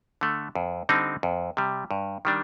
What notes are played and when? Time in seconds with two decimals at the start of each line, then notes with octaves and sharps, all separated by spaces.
0.21 D3 A3
0.55 F2
0.89 D3 G3 C4 D#4
1.23 F2
1.57 C3 G3
1.91 G2
2.25 D#3 G3 D4